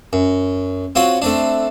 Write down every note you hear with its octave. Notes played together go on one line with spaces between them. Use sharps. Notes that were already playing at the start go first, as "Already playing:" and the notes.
F#2
C4 F4 F#4 C#5
A3 C4 D4